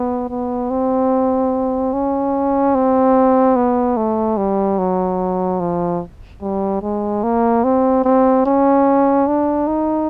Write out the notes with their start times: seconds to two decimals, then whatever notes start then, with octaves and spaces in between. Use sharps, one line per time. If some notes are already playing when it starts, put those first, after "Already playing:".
Already playing: B3
0.29 B3
0.70 C4
1.93 C#4
2.75 C4
3.56 B3
3.97 A3
4.37 G3
4.79 F#3
5.60 F3
6.41 G3
6.82 G#3
7.23 A#3
7.64 C4
8.04 C4
8.46 C#4
9.27 D4
9.67 D#4